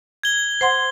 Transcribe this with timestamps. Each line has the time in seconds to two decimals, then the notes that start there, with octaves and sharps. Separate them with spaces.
0.23 G#6 G7
0.61 C5 F#5 C6